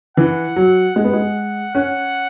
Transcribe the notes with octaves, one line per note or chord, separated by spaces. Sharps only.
E3 F#5
F#3
G#3 F#5
B3
G#3
C#4 F#5